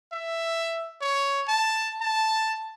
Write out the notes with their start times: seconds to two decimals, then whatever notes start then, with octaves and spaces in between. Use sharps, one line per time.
0.12 E5
1.01 C#5
1.48 A5
2.01 A5